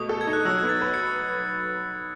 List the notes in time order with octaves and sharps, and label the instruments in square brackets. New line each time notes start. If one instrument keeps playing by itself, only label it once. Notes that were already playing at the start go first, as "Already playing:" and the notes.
Already playing: [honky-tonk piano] B2 A3 [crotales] D#6
[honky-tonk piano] A4
[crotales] G#6
[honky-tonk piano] D#4
[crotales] F#6
[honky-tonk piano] F#3 [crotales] E6
[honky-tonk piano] B3
[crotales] A6
[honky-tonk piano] B4
[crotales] C#7